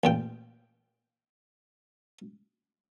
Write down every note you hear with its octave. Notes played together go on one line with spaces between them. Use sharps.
A1 A#2 G5